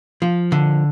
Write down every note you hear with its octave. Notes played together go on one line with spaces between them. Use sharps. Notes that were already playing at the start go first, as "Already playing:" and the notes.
F3
D3